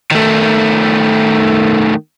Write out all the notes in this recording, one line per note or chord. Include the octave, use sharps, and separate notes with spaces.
D#3 A3